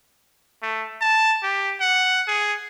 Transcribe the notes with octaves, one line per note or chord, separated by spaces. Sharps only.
A3
A5
G4
F#5
G#4